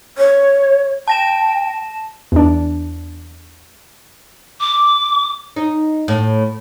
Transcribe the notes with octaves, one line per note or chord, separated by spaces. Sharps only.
C#5
G5 A5 A#6 E7
E2 D4
D6
D#4
A2